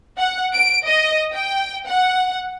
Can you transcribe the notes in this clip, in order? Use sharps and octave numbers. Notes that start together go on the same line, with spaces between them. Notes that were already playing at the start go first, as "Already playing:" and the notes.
F#5
D7
D#5
G5
F#5